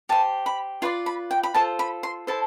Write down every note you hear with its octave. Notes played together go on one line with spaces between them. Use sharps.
G4 C5 A5
B5
F4 B4 D5 C6
B5
G5
B5
F4 A4 C5 A5
B5
C6
E4 A4 C5 A5